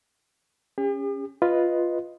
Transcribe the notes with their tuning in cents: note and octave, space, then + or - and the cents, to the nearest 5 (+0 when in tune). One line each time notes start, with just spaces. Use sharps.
C#4 +0 G4 +45
F4 +0 B4 +0 D#5 +0